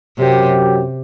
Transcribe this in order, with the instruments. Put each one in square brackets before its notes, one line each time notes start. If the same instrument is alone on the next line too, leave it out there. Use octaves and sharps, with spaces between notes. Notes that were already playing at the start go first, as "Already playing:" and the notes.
[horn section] F#2 F#3 C4 G4 [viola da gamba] C3